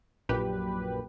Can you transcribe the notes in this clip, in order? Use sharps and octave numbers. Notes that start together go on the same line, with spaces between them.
A#1 F#2 A#2 G4 B4